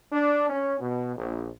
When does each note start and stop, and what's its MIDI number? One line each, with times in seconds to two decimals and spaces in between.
0.12 0.48 62
0.50 0.75 61
0.80 1.15 47
1.17 1.50 34